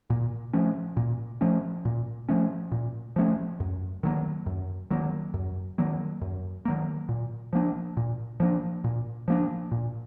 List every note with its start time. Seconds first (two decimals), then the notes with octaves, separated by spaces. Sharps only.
0.10 A#2
0.53 F3 A3 C#4
0.97 A#2
1.41 F3 A3 C#4
1.85 A#2
2.29 F3 A3 C#4
2.72 A#2
3.16 F3 A3 C#4
3.60 F#2
4.03 D#3 F#3 A#3
4.46 F#2
4.91 D#3 F#3 A#3
5.34 F#2
5.78 D#3 F#3 A#3
6.22 F#2
6.65 D#3 F#3 A#3
7.09 A#2
7.53 F3 A#3 D4
7.97 A#2
8.40 F3 A#3 D4
8.84 A#2
9.28 F3 A#3 D4
9.72 A#2